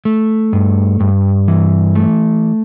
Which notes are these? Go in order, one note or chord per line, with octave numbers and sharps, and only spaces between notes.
A3
G2
G2
E3
A3